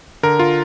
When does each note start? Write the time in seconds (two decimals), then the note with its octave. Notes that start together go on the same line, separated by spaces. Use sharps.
0.23 D3 A#4
0.39 F4